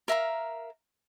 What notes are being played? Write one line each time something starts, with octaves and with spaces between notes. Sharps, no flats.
A#4 E5 F5 A#5